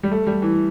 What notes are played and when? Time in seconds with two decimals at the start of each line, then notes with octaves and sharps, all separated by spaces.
0.03 G3
0.11 A3
0.27 G3
0.42 E3